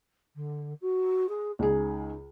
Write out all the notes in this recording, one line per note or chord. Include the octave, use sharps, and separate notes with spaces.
D3
F#4
G#4
C#2 D#4 G#4